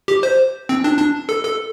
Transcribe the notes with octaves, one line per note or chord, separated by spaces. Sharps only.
G4
C5
C4
D4
D4
A4
A4